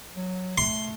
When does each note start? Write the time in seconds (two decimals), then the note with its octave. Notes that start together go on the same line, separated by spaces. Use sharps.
0.16 F#3
0.58 A3 C6